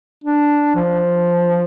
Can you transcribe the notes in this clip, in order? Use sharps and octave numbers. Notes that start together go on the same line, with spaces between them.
D4
F3